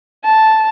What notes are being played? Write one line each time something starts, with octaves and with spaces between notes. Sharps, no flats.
A5